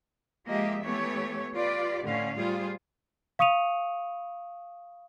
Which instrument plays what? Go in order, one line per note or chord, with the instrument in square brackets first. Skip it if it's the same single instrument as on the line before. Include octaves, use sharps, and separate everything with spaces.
[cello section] F3 G#3 A#3 G4 D#5 E5
E3 A3 B3 G4 C#5
F4 G4 B4 D5
A2 D3 C#4 F5
G3 F4 G#4 C5
[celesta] F5 C#6 D#6 C#7 D#7 F7